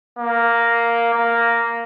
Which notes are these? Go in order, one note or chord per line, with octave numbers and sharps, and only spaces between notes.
A#3
A#3